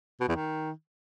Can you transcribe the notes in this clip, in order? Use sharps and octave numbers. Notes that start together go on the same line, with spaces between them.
B2
E2
D#3